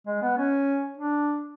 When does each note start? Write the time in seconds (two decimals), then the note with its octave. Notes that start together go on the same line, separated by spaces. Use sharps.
0.07 G#3
0.22 B3
0.37 C#4
0.97 D4